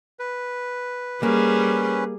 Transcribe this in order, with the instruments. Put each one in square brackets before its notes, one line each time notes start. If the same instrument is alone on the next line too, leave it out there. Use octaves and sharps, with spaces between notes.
[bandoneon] B4
[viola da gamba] G3 G#4 [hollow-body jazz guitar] A#3 [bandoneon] C#4 B4